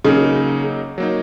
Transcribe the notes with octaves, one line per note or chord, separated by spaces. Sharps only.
C#3 F#3 A#3 D#4
F#3 A#3 D#4